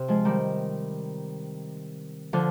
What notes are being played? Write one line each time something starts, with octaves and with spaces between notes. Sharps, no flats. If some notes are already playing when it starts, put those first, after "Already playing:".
Already playing: C3
F3 G#3
D#3 G3
D3 F3